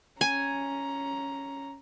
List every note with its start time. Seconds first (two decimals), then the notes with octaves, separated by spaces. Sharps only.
0.21 C#4 G#5 A#5